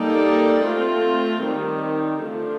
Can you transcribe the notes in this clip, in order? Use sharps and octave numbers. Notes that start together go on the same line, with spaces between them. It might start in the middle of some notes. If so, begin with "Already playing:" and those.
Already playing: G3 A#3 D#4 A4 D5
A3 C4 F4
D#3 G3 C4
D3 F3 A3 D4 F4